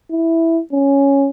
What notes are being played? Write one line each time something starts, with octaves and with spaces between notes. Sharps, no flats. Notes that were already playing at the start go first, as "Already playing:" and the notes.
E4
C#4